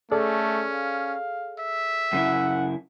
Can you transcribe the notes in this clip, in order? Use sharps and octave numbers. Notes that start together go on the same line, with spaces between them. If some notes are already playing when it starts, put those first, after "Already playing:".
A3 C#4 G#4 A4 D5
F5
E5
F#2 C#3 E4 F#5